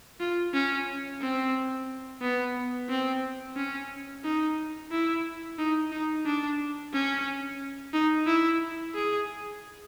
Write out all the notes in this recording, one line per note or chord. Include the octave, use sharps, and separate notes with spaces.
F4
C#4
C4
B3
C4
C#4
D#4
E4
D#4
D#4
D4
C#4
D#4
E4
G#4